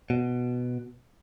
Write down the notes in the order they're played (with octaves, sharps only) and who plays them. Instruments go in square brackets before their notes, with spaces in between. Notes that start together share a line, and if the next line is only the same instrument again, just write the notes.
[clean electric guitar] B2